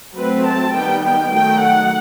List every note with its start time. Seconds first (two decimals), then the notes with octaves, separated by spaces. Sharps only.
0.17 F#3 A3 C4 B4
0.46 A5
0.74 D#3 G3 B3 G5
1.03 G5
1.31 D#3 F#3 A3 G5
1.60 F#5